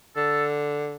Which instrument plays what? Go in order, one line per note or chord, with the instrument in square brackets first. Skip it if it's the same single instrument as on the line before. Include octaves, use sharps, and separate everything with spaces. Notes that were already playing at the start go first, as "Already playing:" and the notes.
[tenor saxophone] D3 [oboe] A4